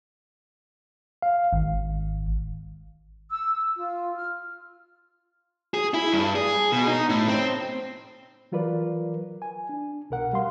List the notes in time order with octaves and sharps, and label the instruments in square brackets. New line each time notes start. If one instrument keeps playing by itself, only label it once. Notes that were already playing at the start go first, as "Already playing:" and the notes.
[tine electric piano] F5
G#1
[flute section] E6
F4
F6
[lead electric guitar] G#4
E4
G2
G#4
B2
D#4
A2
C4
[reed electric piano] E3 F#3 F4 A#4 B4 D5
G#5
D4
C2 B2 A#4 F#5
G3 F5 C6